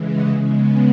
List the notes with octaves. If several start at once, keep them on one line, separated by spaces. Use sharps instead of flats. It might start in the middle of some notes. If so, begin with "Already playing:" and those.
Already playing: C#3 E3 G#3
F#5
C#3 G#3 B3 E5